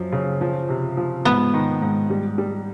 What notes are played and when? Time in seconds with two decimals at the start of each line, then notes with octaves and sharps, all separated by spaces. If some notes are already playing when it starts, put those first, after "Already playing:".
Already playing: F#2 F3
0.12 C#3
0.41 F3
0.69 C3
0.97 F3
1.25 G#2 B3
1.54 D#3
1.82 G#2
2.10 G3
2.38 G3